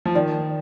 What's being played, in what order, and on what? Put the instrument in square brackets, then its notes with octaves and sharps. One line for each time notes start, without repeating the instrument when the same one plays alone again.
[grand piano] F3
[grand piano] D#3 [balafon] D5